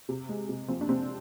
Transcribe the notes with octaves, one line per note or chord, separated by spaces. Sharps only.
C3
G#3
C3
F3 C4
D4
C3 C4